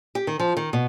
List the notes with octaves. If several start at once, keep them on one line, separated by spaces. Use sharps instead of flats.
G4
D#3
F3
D#3
B2